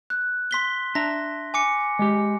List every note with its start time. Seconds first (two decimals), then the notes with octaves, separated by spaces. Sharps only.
0.10 F#6
0.51 C6 B6 G7
0.95 D4 E5 A#5 A#6
1.54 G#5 D6 C#7
1.99 G#3 G4